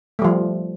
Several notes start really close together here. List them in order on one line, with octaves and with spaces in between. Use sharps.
A3 G3 F3